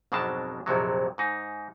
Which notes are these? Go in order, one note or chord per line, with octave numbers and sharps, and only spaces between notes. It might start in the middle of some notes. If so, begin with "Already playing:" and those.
G#1 F2 B2 F#3 D4 A5
A#1 F2 C3 F#3
G#2 D#4